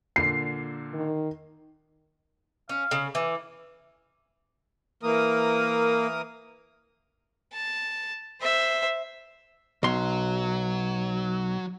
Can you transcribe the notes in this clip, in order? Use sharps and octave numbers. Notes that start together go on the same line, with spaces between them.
A#2 D3 A#3 C7
D#3
C#4 F5
C#3
E3 D6
E3 A#3 A#4 D#6
A5
C5 E5
B1 F#3 C6